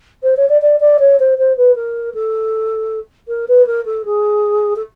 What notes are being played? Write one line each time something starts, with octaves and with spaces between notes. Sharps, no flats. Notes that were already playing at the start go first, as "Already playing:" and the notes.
C5
C#5
D5
D5
D5
C#5
C5
C5
B4
A#4
A4
A#4
B4
A#4
A4
G#4
A4